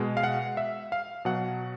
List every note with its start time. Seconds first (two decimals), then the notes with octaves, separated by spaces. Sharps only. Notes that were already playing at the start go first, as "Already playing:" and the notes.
Already playing: B2 G#3
0.17 F5
0.24 F#5
0.57 E5
0.92 F5
1.25 B2 F#3 F#5